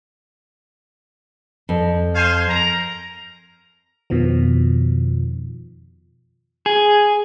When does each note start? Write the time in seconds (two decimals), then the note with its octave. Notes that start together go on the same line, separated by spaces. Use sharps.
1.69 F2
2.15 C5 F5 G#5
2.48 A#4 A#5
4.10 F2 B2 D#3 F3
6.66 G#4